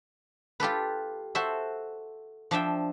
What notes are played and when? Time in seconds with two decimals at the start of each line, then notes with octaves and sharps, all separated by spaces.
0.60 F4 G4 A4 B4
1.35 F#4 A4 C5 E5
2.51 F3 D4 E5 G5